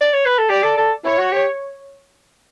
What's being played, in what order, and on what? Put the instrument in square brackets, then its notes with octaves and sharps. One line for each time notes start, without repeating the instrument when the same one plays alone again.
[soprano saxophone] D5
C#5
B4
A4
[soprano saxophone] G4 [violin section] D5
[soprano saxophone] A4
A4
[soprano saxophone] E4 [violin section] C#5
[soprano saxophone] F#4
G4